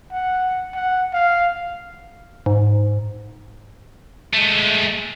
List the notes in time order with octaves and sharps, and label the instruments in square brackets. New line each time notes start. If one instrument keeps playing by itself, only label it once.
[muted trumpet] F#5
F#5
F5
[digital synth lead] G#2
[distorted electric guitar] G#3 A3